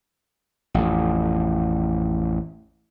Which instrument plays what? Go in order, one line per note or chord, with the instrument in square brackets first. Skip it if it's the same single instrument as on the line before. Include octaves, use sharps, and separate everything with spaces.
[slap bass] A1 F2